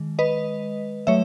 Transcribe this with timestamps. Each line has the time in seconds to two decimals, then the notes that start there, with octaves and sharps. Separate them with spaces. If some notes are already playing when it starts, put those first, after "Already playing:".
Already playing: D#3 G#3
0.19 B4 D#5
1.07 F#3 A3 C#5 E5